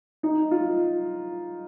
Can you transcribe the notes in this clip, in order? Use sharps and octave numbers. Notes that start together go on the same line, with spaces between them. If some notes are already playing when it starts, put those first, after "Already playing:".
D#4
F4